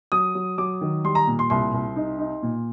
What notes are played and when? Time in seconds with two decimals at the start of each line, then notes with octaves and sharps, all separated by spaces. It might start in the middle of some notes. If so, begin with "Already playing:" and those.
0.12 F#3 D#6
0.35 F#3
0.58 F#3 D6
0.81 D#3
1.04 G3 C6
1.15 A#5
1.27 A#2
1.39 C6
1.50 C2 C6
1.73 C2
1.96 D#4
2.19 D#4
2.42 A#2